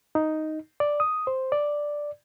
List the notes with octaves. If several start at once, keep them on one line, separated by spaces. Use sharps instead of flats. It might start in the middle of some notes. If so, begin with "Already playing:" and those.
D#4
D5
D#6
C5
D5